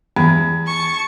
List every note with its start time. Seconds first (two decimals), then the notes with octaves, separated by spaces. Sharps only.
0.16 E2
0.67 A5 C#6